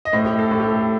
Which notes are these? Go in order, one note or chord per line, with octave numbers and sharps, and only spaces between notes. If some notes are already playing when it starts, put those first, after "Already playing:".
D#5
A2 C5
G4
A4
A2
G4
A4